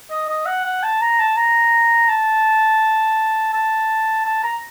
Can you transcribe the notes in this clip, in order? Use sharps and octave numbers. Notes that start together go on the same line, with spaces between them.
D#5
D#5
F#5
F#5
A5
A#5
A5
A#5
A5
A5
A5
A#5